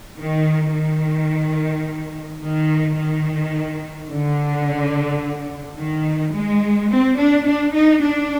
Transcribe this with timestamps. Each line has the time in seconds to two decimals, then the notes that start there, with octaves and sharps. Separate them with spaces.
0.18 D#3
0.74 D#3
2.43 D#3
2.98 D#3
4.11 D3
5.79 D#3
6.35 G#3
6.91 C4
7.19 D4
7.47 D4
7.75 D#4
8.03 D4